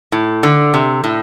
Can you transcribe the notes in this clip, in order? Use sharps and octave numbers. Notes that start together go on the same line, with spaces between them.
A2
D3
C3
A2